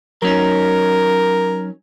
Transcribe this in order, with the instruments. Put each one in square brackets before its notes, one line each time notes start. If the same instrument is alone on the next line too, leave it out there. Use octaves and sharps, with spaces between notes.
[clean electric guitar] F#3 C#4 D#4 [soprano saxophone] A#4